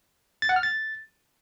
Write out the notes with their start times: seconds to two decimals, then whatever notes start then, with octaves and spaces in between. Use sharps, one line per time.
0.42 A6
0.49 F#5
0.56 F6
0.63 A6